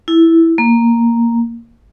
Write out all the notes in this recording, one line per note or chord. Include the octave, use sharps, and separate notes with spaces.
E4
A#3